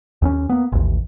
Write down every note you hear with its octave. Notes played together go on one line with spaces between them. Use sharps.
D#2 C4 C#4
A#3 B3
A1 D#2